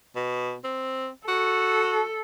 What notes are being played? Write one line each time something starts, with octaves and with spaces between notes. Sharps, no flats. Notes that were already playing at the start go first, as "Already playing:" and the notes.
B2
C4
F#4 A4